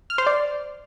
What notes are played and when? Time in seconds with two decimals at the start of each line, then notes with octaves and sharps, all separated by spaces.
0.10 F6
0.18 C5
0.27 D5